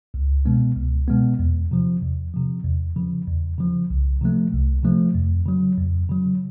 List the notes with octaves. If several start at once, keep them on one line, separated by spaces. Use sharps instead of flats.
C#2
B2 G#3 B3
C#2
B2 G#3 B3
E2
C3 F3
E2
C3 F3
E2
C#3 F3
E2
C#3 F3
C2
C3 F3 A3
C2
C3 F3 A3
F2
C#3 F#3
F2
C#3 F#3